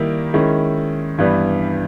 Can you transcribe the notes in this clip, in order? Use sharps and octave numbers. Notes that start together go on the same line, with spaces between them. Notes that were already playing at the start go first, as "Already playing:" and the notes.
Already playing: D#3 G3 A#3 E4
D#3 G#3 C#4 E4
G2 E3 G3 B3